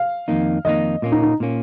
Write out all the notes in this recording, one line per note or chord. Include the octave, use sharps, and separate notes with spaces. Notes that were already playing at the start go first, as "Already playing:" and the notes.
Already playing: F5
F2 D#3 A#3 D#4
F2 D#3 A#3 D#4 D#5
A#2 A#3 C#4
D#4
D#4
A#2 A#3 C#4